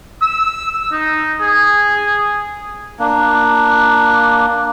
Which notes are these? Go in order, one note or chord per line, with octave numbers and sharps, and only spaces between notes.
E6
D#4
G#4
A#3 D4